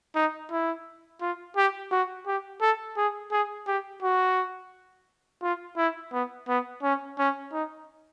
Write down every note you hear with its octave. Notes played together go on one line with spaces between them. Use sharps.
D#4
E4
F4
G4
F#4
G4
A4
G#4
G#4
G4
F#4
F4
E4
B3
B3
C#4
C#4
D#4